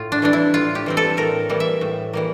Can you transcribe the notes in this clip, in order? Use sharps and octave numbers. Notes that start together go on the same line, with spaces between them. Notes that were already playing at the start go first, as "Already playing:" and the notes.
Already playing: A2 F4
D4
E3 G3 C4 D4
E4
A2 F4
G4
E3 G3 C4
A4
A2 A#4
E3 G3 A#3
E5
A2
E3 G3 A#3